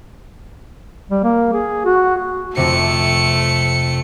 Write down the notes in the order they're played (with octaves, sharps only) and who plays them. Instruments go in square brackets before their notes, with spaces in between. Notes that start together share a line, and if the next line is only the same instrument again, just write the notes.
[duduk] G3
A#3
G#4
F#4
[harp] F2 C3 [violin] A3 C#7